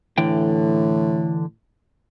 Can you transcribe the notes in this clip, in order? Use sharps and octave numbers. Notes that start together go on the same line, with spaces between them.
A2 D3 E3 G5